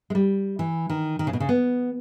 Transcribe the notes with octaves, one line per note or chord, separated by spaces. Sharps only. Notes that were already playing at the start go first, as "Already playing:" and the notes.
G#3
G3
E3
D#3
D#3
C#3
B2
C#3
B3